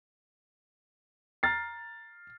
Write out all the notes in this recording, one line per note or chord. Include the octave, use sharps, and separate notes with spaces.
A#5 F6 A6 C7